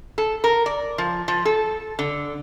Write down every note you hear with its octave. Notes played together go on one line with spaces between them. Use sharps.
A4
A#4
D5
F3
F3
A4
D3